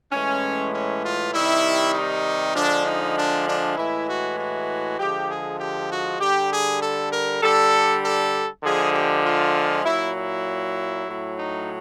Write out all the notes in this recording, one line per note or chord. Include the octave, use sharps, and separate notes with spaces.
A2 E3 G#3 C#4
C#4
F4
C3 D#3 G3 E4
D#4
D3 F3 G#3 D4
D#4
D4
D4
A2 E3 G#3 E4
F#4
F#4
D3 F3 G#3 G4
G#4
G4
F#4
D3 G3 G4
G#4
A4
A#4
D3 G3 A4
A4
D3 F3 G#3 G#4
G4
F4
A#2 F#3 E4
E4
A2 F#3
D#4